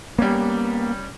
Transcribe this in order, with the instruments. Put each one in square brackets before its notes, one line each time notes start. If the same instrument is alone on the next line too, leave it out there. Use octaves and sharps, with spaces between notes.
[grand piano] G3 C#4 [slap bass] A#3 B3